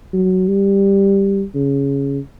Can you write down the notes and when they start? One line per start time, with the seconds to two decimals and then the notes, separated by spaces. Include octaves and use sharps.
0.13 F#3
0.48 G3
1.55 C#3